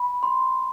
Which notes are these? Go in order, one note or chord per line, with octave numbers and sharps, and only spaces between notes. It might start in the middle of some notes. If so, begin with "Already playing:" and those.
Already playing: B5
C6